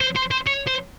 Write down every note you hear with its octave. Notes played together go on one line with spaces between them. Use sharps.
C5
C5
C5
C#5
C5